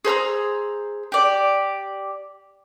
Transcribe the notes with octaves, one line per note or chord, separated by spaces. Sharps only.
G#4 C5 A#5 E6
G4 D5